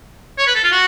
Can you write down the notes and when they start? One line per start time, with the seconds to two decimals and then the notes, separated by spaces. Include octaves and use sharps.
0.38 C#5
0.47 B4
0.55 A4
0.64 F4
0.72 F#4